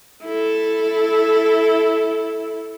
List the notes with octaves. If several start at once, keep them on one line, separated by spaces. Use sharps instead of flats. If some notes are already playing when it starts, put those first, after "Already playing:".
E4 A4